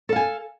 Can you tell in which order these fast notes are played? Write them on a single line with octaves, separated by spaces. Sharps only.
A4 F5 G#5